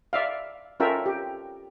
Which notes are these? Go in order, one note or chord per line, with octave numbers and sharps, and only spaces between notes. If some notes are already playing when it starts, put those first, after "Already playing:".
D5 E5 F5
C#4 F4 A4 A#4 E5 G5
G4